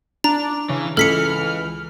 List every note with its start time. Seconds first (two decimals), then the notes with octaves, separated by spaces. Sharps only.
0.24 D4 A#5
0.69 C#3 E3
0.97 C#2 E3 A4 F6 B6 C#7